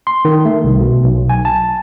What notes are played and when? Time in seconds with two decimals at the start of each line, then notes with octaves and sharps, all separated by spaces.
0.07 C6
0.25 D#3
0.45 A3
0.64 C2
0.80 B2
1.04 B1
1.30 G#5
1.45 A5